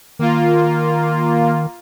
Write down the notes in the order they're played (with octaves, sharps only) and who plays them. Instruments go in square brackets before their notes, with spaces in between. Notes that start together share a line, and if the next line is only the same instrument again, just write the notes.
[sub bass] D#3 [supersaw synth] A#3 F4